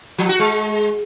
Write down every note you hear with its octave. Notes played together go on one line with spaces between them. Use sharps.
F3
F#4
G#3